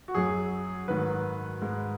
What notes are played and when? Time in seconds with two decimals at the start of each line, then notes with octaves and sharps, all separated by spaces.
0.08 F#4
0.14 F#2 F#3 G#4
0.88 G#2 D#3 F#3 B4
1.61 G#2 G#3